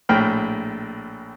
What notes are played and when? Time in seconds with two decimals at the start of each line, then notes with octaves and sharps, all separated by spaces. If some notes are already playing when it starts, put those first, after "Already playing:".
0.09 A#1 A2 G5 F6